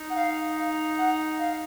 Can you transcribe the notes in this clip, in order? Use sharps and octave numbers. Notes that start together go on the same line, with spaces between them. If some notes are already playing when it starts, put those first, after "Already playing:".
Already playing: D#4
F#5
F5
F5
F#5
F5